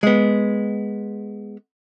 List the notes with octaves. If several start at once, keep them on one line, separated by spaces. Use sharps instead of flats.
G#3 B3